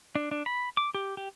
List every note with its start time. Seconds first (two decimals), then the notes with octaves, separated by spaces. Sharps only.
0.15 D4
0.31 D4
0.46 B5
0.77 D6
0.95 G4
1.17 G4